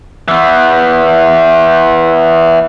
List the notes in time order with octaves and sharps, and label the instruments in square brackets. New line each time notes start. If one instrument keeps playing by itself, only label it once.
[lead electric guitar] E3 B3